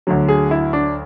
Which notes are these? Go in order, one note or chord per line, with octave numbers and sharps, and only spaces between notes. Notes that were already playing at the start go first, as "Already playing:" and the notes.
D2 D3 F#3
G#4
E4
D4